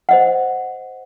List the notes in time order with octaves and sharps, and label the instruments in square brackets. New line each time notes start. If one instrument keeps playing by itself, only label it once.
[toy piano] C5 D#5 F#5